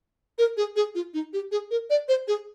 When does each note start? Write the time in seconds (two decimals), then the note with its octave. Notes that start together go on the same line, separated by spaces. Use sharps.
0.38 A#4
0.57 G#4
0.76 G#4
0.95 F4
1.14 D#4
1.33 G4
1.52 G#4
1.71 A#4
1.90 D5
2.08 C5
2.28 G#4